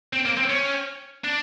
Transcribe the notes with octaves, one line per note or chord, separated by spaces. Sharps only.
C4
A#3
C4
C#4
D4